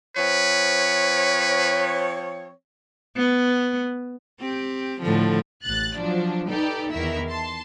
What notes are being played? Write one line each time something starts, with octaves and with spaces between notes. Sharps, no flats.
F3 C4 B4 C#5
B3
C4 G4
A2 D3 F3
A1 F#6 A6
F3 F#3 D4
D#4 G4 A4 B4 D5
E2 D#3 E4 A#4 E5
A5 C6